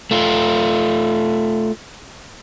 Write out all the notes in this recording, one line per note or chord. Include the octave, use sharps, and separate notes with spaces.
A3 F4